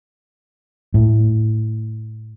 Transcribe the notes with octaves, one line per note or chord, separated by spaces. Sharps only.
A2